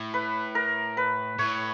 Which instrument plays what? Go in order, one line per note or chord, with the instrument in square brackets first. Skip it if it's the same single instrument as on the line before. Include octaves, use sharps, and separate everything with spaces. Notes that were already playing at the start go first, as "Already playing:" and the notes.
Already playing: [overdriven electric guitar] A2
[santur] B4
A#4
B4
[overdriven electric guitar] A2 [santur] C#5